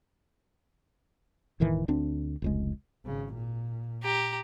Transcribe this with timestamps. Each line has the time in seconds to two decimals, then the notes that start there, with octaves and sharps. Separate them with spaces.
1.60 E1 A2 D#3 E3
1.88 D2 C4 D4
2.42 F1 C#2 G#3
3.05 G#1 C#3
3.34 A#2
4.03 G4 A#5